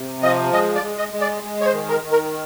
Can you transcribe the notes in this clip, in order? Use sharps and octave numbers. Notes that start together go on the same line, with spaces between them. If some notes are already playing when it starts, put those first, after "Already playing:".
Already playing: C3
F3 D#5
G#3 D#5
D5
G#3
D#5
G#3
D5
G#3
C#5
C5
D#3
A#4
D#3
A#4